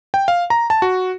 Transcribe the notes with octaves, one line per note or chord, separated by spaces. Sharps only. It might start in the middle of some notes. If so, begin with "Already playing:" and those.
G5
F5
A#5
A5
F#4